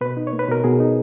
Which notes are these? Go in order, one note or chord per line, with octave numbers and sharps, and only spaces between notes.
B2 B4
D#4
C#5
A#3
B4
B2 A#4
B2 G#4
D#4